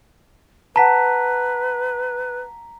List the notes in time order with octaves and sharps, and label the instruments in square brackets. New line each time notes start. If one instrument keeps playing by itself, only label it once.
[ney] B4 [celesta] F#5 A5 [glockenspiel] A#5 B6